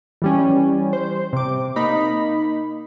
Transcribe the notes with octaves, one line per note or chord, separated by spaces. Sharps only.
E3 G3 C#4
C5
C3 D6
A#3 D#4 B5